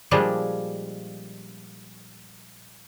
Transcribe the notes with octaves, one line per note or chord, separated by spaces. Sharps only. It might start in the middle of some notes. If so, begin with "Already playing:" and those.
A#2 F3 G3 G#3 D4